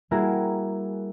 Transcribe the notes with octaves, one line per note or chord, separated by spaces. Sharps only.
G3 A#3 E4 F#4 G#4 A#4